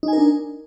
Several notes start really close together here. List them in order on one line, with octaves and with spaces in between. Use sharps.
D#4 G#5 A#4 D4